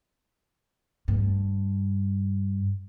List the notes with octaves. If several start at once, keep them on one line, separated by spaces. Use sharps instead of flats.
G2 A3